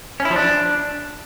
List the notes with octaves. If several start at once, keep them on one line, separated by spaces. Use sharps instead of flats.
C#4
E4
F3
D4